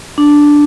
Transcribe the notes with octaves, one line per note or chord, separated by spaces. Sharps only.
D4